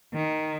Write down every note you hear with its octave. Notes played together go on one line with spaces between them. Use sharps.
D#3